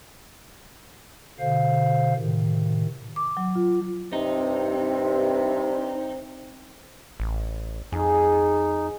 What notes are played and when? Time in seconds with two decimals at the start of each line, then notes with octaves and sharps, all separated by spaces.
1.39 B2 D3 C5 F5
2.17 A2 C3 D#3
3.16 D6
3.37 F#3
3.56 F4
4.13 G2 C3 C4 D#4
7.20 A1
7.92 F2 D#4 G#4